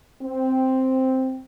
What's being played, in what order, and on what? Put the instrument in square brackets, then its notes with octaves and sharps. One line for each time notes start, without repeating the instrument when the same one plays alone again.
[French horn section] C4